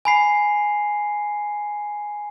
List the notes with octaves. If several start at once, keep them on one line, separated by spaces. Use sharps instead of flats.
G#5 B5 C7